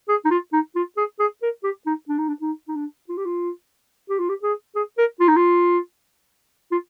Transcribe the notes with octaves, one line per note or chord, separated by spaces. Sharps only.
G#4
D#4
F4
D#4
F4
G#4
G#4
A#4
G4
D#4
D4
D#4
D4
D#4
D#4
D4
F4
G4
F4
G4
F4
G4
G#4
G#4
A#4
F4
D#4
F4
F4